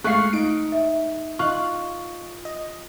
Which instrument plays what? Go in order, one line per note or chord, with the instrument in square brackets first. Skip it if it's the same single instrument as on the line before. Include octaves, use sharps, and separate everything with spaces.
[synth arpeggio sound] G#3 A3 [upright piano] F5 F#6 [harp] C#6 C7
[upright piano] D#4 [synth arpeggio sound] D7
[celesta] E5
[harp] F4 [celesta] D#5 C#6 [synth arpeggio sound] F#6
[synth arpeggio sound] D#5